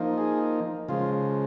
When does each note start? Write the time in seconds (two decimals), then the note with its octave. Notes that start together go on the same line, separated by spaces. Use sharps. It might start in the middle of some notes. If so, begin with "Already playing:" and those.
Already playing: F3 A#3 D#4
0.18 G#4
0.89 C#3 F3 G#3 F4